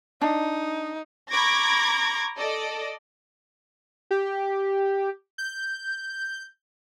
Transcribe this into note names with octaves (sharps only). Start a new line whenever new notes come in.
D4 D#4
A#5 B5 C#6 D6 G#6 A#6
A4 D5 D#5
G4
G6